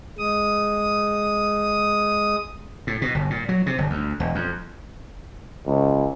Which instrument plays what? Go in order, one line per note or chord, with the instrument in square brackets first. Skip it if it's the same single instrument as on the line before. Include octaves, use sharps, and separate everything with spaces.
[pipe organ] G#3 D#6
[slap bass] A2
B2
G1
A#2
F#3
C3
G1
D2
E1
F2
[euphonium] C#2